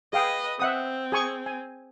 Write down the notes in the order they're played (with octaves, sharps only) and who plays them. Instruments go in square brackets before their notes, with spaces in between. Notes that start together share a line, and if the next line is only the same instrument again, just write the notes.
[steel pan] G#4 F5 G5 [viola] B4 D#5
[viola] C4 [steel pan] E5 F#5 D#6
[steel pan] G#4 G#5 C#6
G#5